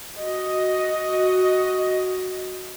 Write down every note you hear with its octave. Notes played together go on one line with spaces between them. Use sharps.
F#4 D#5